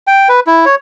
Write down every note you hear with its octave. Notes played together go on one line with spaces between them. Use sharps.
G5
B4
E4
C#5